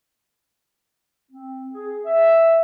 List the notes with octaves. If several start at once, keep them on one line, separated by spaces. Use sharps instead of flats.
C4
G#4
E5